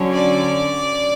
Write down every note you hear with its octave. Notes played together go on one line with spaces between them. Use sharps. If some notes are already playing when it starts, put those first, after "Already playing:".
Already playing: D3 F#3 C#4
D5